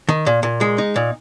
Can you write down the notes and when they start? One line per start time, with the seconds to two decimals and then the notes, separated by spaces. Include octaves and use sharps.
0.09 D#3
0.26 A#2
0.43 A#2
0.61 G#3
0.78 D#4
0.96 A#2